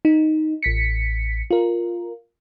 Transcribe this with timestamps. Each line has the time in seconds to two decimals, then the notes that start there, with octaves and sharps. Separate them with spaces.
0.05 D#4
0.63 A1 B6 C#7
1.51 F4 A#4